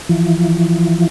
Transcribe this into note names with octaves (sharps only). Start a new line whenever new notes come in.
E3 F3